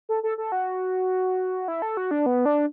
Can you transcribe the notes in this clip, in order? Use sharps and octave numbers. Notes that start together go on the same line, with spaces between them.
A4
A4
A4
F#4
E4
A4
F#4
D4
B3
D4